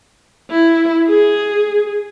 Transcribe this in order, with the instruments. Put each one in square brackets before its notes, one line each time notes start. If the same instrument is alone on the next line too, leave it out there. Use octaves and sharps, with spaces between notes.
[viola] E4
G#4